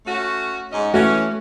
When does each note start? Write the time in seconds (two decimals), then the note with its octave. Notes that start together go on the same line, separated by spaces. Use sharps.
0.05 A3 C#4 F#4
0.71 G#2 C#4 D#5
0.94 E3 A3 C#4 F#4